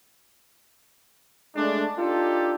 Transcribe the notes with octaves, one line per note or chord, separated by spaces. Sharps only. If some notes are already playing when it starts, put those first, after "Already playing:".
G#3 A3 D4
D4 D#4 F4 G4 A4